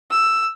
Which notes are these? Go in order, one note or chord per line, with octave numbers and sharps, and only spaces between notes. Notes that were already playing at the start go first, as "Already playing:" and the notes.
E6